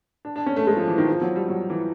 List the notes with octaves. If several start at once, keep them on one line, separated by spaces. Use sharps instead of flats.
D4
D4
C#4
A3
G#3
F3
E3
D#3
F3
F#3
G3
F#3
E3